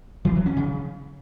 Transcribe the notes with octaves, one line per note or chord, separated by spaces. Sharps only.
E3
F#3
C#4
C#3